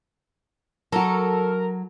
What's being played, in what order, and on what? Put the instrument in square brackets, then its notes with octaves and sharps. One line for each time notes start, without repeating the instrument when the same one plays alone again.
[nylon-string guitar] F#3 F#4 [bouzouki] A4 [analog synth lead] A#4